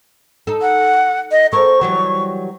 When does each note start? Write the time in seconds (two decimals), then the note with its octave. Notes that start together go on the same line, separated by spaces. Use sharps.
0.47 D#4 A4
0.62 F#5
1.31 D#5
1.53 C4 A4 A#4 C#6
1.81 E3 F#3 G3